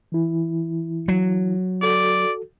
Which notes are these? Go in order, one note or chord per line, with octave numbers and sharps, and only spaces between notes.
E3 E4
F#3
F#4 A4 D5